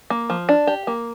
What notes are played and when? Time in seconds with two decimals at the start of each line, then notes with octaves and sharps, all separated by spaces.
0.10 A#3
0.30 F3
0.49 D4
0.67 G4
0.87 A#3